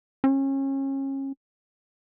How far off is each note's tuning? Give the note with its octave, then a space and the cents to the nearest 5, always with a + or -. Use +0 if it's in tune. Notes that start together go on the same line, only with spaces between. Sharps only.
C#4 -30